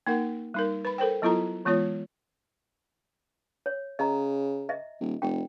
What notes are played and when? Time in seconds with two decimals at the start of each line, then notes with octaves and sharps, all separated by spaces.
0.07 A#3 D#4 A#4 F#5
0.54 G3 D#4 A#4
0.85 B4 B5
0.98 A4 A#4 C5 G5
1.22 F#3 B3 E4 F4 A4 A#5
1.65 E3 G#3 B3 F4 C#5
3.66 C#5
3.99 C#3 D#5 A#5
4.69 D#5 E5
5.00 D#1
5.22 F1 G5